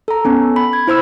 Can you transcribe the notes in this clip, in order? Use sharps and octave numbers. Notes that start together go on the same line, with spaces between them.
A4 A#5
B3 C#4 A4
B5
G#6
E4 C5 B5 E6